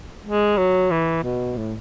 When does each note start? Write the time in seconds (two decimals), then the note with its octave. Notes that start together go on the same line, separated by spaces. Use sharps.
0.24 G#3
0.57 F#3
0.91 E3
1.24 B2
1.57 A2